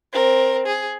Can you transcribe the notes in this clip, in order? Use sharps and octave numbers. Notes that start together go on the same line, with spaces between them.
C4 A#4
G#4